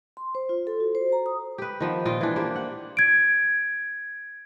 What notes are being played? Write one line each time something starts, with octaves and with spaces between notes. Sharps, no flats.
C6
C5
F4
A4
F#4
C5
A#5
D#6
G4 B4
D#3 F3 B3
A#2 F4 D#5 G5
E3 D4
A#3 G4 C5
F#5
G#6 D7